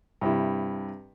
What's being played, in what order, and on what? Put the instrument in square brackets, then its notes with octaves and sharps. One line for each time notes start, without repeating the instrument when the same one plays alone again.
[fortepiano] G2 C3 E4